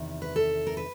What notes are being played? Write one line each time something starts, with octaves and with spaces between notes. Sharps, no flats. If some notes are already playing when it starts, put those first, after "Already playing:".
Already playing: E2 C3 D#3
B4
A4
A#4
B4